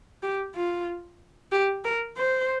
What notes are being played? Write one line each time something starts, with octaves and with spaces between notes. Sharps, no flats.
G4
F4
G4
A#4
C5